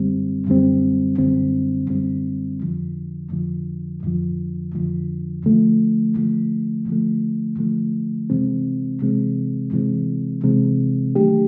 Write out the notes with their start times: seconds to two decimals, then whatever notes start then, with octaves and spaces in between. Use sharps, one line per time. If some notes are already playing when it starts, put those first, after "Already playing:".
Already playing: F#2 D3 G3 C4
0.47 F#2 D3 G3 C4
1.18 F#2 D3 G3 C4
1.90 F#2 D3 G3 C4
2.61 F2 D3 F3
3.32 F2 D3 F3
4.03 F2 D3 F3
4.75 F2 D3 F3
5.45 D3 F3 A3
6.17 D3 F3 A3
6.88 D3 F3 A3
7.59 D3 F3 A3
8.30 C3 E3 G#3 C4
9.02 C3 E3 G#3 C4
9.73 C3 E3 G#3 C4
10.44 C3 E3 G#3 C4
11.16 D#3 F#3 A3 D4 G4